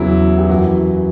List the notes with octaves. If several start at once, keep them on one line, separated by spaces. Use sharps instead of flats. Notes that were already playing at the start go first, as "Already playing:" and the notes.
Already playing: E2 C#3 F#3 E4
G4
F#2 E3 F#4